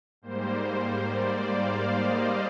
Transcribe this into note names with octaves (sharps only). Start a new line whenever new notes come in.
G#2 G3 A#3 C5
C5
C5
D5
F5
D#5